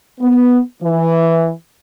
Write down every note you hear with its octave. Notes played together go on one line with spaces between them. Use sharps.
B3
E3